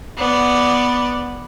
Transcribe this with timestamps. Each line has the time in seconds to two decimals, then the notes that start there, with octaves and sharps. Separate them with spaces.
0.18 B3 D5